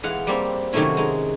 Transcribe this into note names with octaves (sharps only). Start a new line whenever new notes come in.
E3 G#3 F5 F#5
G3 A#3 C4
C3 D#3 F#3 A3 C#4 E4
G#3 D#4